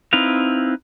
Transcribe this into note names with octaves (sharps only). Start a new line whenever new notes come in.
C4 D#4 E4 B4 F5